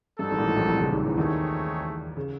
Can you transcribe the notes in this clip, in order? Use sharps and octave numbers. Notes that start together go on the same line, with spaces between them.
G2 C4 D#4 F#4 A4
G#1 G#2
A#2
A1 A2
A#1 A#2
C2 C3
C#2 C#3
D#2 D#3
E2 E3
D#2 D#3 A3 C4 D#4 G#4 C#5
C#3